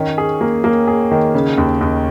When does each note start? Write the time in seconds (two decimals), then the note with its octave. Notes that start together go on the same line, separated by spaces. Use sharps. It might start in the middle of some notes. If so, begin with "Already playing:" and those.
Already playing: D#3 C#4
0.18 G#4
0.41 A#3
0.64 A#3
0.87 G#4
1.11 D#3
1.34 C#3
1.58 D#2
1.81 D#2